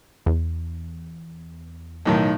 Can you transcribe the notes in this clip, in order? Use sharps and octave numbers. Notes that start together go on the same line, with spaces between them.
E2
B1 A2 D#3